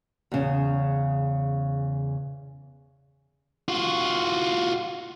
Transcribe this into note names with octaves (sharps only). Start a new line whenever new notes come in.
E2 C#3
F4 F#4